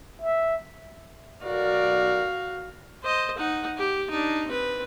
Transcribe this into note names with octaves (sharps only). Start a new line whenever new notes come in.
E5
B1 F#4 A#4 D5 F5
C5 D#5
D#4 F#5
G4
D4 D#4
C4 B4